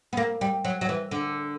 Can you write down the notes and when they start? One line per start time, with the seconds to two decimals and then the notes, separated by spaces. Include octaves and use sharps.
0.13 B3
0.17 A#3
0.41 G3
0.65 F#3
0.81 F#3
0.89 E3
1.11 D3